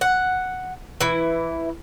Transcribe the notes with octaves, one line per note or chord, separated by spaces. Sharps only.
F#5
E3 E4